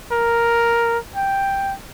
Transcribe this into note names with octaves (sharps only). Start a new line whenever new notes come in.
A#4
G5